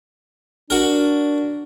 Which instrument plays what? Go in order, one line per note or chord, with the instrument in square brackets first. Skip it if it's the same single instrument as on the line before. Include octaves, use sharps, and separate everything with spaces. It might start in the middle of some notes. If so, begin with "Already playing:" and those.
[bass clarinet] D4 [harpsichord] F#4 A#4